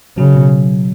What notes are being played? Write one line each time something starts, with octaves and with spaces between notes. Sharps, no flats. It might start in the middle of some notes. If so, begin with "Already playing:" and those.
C#3 F#3
B2